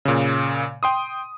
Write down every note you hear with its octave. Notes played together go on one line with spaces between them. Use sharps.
A#2 C#3
G5 C6 D#6